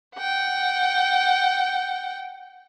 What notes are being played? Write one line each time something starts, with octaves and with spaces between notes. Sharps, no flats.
F#5 G5